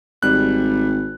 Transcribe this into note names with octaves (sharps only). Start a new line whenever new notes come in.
G#1 G3 F#6